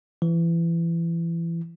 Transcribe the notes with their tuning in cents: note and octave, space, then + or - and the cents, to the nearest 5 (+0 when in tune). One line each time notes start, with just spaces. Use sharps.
E3 +25